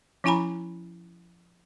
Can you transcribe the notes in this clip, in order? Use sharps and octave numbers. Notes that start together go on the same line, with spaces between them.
F3 C#4 E4 G#5 A#5 B5